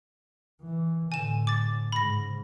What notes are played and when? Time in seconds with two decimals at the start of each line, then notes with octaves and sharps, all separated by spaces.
0.61 E3
1.12 A2 D3 G#5 E7
1.47 D6 A6
1.92 G#2 C#3 B5 A#6